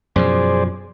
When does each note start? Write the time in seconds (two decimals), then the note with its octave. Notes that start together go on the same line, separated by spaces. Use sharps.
0.16 F#2 B2 F3 G#4 C5 D5